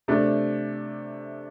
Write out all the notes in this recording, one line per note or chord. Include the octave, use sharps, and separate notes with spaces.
C3 A3 D4